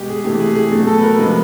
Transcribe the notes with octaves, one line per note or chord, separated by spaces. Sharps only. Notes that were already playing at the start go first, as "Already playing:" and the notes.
Already playing: B2 G#3 G4
G#4
C3 E3 A3 G4
G#4
G#4
B2 F#3 A3
A4
B4
A#4
C3 F3 G#3 B4